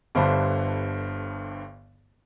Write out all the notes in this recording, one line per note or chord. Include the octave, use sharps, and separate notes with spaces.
G1 G2 D3 C5 A5 B5